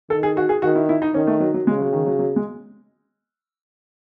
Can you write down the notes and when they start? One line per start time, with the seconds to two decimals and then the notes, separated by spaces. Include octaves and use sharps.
0.10 D#3 A4
0.23 G#4
0.37 F#4
0.49 G#4
0.62 D#3 F#4
0.75 E4
0.89 E4
1.02 D#4
1.14 D#3 C#4
1.27 A3
1.40 F#3
1.54 F#3
1.67 C#3 G#3
1.80 F#3
1.93 D#3
2.06 F#3
2.19 F#3
2.36 G#3